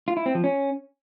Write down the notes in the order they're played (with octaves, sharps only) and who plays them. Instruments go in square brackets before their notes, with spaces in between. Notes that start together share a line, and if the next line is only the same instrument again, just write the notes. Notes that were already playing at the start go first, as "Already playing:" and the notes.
[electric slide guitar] F4
E4
C4
F3
C#4